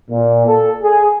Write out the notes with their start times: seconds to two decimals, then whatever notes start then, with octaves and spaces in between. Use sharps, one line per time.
0.11 A#2
0.46 A4
0.83 G#4